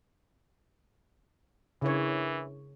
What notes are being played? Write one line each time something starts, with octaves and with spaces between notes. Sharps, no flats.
C#3 E3 D4 E4 A#4 C#5